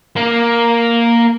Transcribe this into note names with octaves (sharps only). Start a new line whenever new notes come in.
A#3